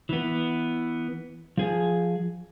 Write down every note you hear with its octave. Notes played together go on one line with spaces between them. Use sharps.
E3 B3
F3 G#4